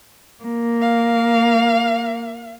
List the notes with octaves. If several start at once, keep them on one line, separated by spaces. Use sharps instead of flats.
A#3
F5